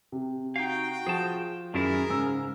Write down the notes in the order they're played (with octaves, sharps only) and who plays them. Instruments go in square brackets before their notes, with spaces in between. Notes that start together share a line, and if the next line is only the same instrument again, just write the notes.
[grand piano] C3
[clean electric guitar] D#4 F5 [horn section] F#4 G5
[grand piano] F3 [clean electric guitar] G#4 A5
[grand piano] F#2 [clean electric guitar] D#3 D4 E4 [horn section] G#4 A#4
[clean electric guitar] G#2 [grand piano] C#3 E6